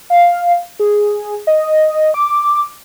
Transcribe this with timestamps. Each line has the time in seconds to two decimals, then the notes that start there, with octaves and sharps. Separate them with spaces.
0.10 F5
0.80 G#4
1.47 D#5
2.14 D6